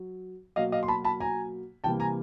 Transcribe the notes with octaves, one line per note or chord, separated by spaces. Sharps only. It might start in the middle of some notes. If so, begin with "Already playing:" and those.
Already playing: F#3
B2 F#3 A#3 D#5 F5
D#5 F5
C6
A5 B5
A5 B5
G#5 A#5
C3 E3 G3 A#3 G5 A5
G#5 A#5